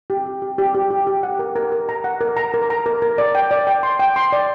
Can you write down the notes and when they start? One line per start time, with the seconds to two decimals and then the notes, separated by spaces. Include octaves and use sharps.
0.10 G4
0.26 G4
0.42 G4
0.58 G4
0.75 G4
0.91 G4
1.07 G4
1.23 F#5
1.39 A#4
1.56 A#4
1.72 A#4
1.89 A#5
2.04 F#5
2.21 A#4
2.37 A#5
2.54 A#4
2.70 A#5
2.86 A#4
3.02 A#4
3.18 D5
3.35 G5
3.51 D5
3.67 G5
3.83 C6
4.00 G5
4.16 C6
4.32 D5